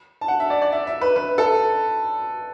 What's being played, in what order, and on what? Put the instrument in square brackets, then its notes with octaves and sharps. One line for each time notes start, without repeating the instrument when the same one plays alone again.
[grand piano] A5
F#5
E5
D5
D5
E5
E5
B4
B4
A4